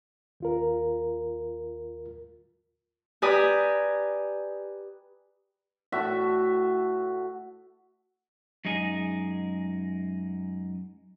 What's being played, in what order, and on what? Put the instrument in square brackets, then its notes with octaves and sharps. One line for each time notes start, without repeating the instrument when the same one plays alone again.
[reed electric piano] D#2 F4 A#4
[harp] G4 B4 D5 G#5 A#5 D#6
[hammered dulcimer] A2 F#4 E5
[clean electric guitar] F#2 G#3 D#4 G#4